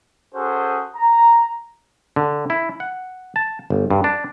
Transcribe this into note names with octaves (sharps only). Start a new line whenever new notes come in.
C#4 F#4 G#4 A4 C5
A#5
D3
E4
F#5
A5
G1
G2
D4